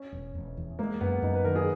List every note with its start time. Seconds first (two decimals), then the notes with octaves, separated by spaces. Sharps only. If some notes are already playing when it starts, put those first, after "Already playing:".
Already playing: C#4
0.12 E1
0.35 E1
0.57 E2
0.79 G#3 A#3
1.01 F#2 B3
1.22 F#2 D#4
1.34 B4
1.44 D#3 A#4
1.56 G#4